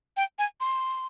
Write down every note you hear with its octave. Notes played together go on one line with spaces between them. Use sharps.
G5
G#5
C6